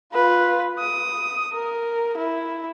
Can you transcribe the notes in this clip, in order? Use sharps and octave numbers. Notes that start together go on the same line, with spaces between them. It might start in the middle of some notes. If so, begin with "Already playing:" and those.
F4 B4
D#6
A#4
E4